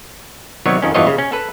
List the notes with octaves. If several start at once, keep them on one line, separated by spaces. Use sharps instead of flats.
C3 D#3 F#3 G3 B3 C#5
F2 D#3 C#4
E2 G2 E3 F4 C#5 D#5
C#3
C#4
A4 B4